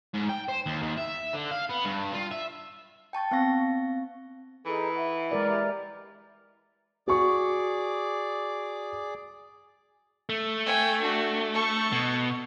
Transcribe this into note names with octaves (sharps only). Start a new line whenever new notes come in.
G#2
G5
C5
D#2
D#2
E5
D3
F5
B3
G2
F4
E5
G5 A5 C#6 A6
B3 C4 F5 C#6 A#6
E3 D#4 G#4 A4
E5 F#5
G#3 A#4 D5
G4 E5 A#5
F#4 G#4 D5 C#6 D6
A3
G5 G#5
D4 F#4
A4 C#6
B2